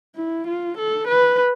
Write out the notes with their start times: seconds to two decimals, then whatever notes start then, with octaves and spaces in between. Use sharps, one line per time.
0.15 E4
0.47 F4
0.78 A4
1.08 B4